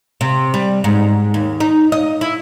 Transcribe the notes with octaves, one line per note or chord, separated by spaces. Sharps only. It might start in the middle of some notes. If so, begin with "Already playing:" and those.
C3
G3
G#2
D#2
D#4
D#5
E4